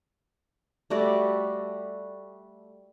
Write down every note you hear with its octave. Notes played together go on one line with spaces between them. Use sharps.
G3 A3 F#4 D5